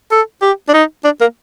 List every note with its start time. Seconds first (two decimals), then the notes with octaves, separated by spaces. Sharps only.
0.11 A4
0.42 G4
0.68 D4
0.74 D#4
1.04 D4
1.21 A#3